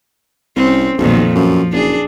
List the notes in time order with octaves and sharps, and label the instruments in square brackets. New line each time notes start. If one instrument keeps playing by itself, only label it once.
[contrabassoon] C2 [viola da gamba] C4 C#4
[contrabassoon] B1 [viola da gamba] F2 A#2 D#3
[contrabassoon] F#2 [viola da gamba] F3
[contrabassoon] F#1 [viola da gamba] D4 G#4